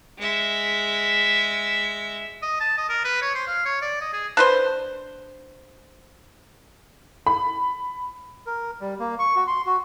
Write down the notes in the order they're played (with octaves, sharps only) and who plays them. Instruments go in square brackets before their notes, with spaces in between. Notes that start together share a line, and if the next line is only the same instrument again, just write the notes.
[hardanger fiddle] G#3 E5
[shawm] D#5
A5
D#5
A#4
B4
C#5
C5
F5
C#5
D5
D#5
G#4
[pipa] D4 B4 C5
[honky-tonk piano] B5
[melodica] A#4
G3
A#3
C#6
F#4
C6
F#4